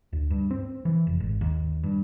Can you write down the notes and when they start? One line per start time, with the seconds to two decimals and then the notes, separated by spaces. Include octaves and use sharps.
0.13 D2
0.30 G2
0.51 C4
0.85 E3
1.07 F1
1.20 G#1
1.41 D#2
1.83 G2